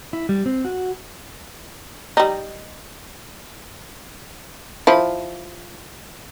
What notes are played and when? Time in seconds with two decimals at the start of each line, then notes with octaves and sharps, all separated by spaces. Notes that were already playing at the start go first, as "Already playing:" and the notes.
0.13 E4
0.29 G3
0.46 C4
0.65 F#4
2.17 G3 D#4
4.87 F3 E4